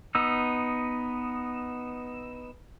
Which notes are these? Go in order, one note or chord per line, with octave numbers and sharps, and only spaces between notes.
B3 D#4 E6